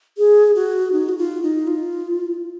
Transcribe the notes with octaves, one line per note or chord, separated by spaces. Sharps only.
G#4
F#4
D#4
F#4
F4
D#4
F4